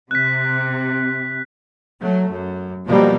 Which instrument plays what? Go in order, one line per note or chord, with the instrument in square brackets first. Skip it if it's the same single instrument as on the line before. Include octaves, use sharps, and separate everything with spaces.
[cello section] C3 [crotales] F#6 B6
[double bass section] F#3 A3
F#2
B2 F3 G3 A#3